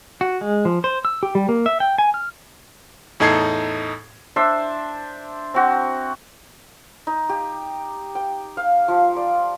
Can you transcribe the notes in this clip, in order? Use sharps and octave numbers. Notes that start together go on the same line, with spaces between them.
F#4
G#3
F3
C5
E6
G4
G3
A#3
E5
G5
G#5
F6
E2 A2 D#4 A4 G#6 C7
D4 C5 E5
C4 F#4
D#4
G4
G5
F5
F3
D5